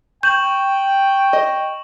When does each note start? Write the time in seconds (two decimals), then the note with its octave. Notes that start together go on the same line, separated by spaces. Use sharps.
0.23 G5 C#6 G6 E7 F#7
1.33 D#5